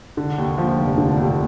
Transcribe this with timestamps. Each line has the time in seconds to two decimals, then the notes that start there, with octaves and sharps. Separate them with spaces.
0.17 D3
0.38 D#2
0.58 F3
0.78 F1
0.98 D3
1.17 D#2